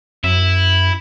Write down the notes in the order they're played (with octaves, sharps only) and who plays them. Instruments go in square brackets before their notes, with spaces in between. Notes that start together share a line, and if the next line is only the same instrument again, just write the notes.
[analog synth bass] F#2 [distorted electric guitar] E4